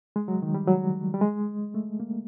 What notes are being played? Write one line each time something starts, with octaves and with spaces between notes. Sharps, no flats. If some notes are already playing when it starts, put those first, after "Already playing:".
G#3
F#3
D#3
G3
F#3
G3
G#3
A3
A#3